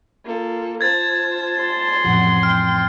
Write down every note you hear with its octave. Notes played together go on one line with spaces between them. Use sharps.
A#3 F4 A4
F4 C5 A5 G#6 A6
C6
A1 F2 F#5
G5 F6